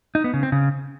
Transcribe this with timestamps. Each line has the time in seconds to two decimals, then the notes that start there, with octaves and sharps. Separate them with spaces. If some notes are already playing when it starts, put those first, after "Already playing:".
0.15 D#4
0.24 B3
0.34 C#3
0.43 C4
0.52 C#3